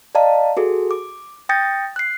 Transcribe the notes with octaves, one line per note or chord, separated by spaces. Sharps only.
D5 D#5 F5 A5 A#5
F#4 G#4 A4
D6
G5 D#6 G6 A6 A#6 C#7
F#6 C7